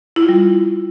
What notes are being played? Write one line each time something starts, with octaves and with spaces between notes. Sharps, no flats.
E4
F4
G3